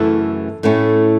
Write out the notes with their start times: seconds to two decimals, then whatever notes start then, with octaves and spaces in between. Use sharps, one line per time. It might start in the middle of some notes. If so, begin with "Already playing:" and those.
Already playing: F#2 C#3 E3 A3 E4 A4
0.63 A2 A3 C#4 E4